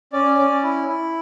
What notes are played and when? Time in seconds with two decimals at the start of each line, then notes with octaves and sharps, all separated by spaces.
0.13 C#4 D5
0.38 C#4
0.63 E4
0.88 E4